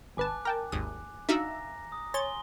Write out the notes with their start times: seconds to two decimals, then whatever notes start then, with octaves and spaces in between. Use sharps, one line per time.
0.17 G#1 B4 G#5 A5 D6 F#6
0.45 A#4 G5 A5 A#5
0.72 G#1 D#2 D#6
1.29 D4 D#4 F#4 E5 F5 A#5 E6 A#6
1.92 D#6
2.14 C#5 G#5 C6 A6 G7